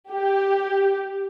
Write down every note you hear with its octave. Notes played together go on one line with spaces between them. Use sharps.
G4